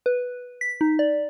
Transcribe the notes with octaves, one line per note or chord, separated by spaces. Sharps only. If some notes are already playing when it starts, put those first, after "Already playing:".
B4
B6
D#4
D5